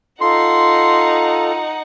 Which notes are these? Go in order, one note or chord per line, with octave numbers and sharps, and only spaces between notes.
D#4 F4 A4 F#5 C6